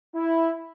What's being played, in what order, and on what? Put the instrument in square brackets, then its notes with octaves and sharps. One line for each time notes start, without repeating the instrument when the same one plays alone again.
[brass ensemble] E4